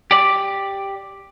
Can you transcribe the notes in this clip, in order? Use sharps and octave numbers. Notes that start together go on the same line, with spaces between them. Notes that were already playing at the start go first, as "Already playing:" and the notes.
G4 D5